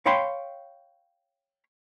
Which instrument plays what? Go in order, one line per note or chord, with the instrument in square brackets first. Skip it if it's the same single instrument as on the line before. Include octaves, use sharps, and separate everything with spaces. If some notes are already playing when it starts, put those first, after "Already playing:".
[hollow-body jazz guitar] C#5 F5 G5 B5 C6